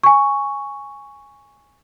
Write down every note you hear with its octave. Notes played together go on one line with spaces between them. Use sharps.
G#5 C#6